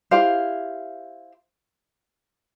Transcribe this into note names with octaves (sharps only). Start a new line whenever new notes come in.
E4 G4 C5 F5